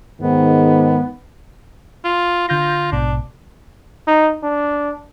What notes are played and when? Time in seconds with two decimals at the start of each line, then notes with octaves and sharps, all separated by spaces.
0.21 G#2 D#3 B3
2.05 F4
2.49 D3 F4 G6 A#6
2.92 A#1 G#2 B2 D4
4.08 D#4
4.43 D4